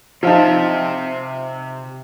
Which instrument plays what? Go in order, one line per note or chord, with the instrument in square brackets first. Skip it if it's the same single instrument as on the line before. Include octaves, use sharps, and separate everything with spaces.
[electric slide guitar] C3 E5 [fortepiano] F3 D#4 [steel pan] F4 F5 A5